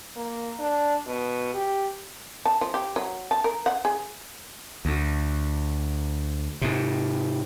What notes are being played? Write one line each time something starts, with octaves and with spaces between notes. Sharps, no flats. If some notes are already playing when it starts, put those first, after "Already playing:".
A#3
D4
B2
G4
A5
F3
G4
F#3
A5
A#4
F#5
G#4
D2
G#2 C3